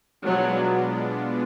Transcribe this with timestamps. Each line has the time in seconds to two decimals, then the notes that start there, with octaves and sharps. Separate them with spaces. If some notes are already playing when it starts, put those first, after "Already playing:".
0.25 B2 F#3 G#3 B3 D4 F4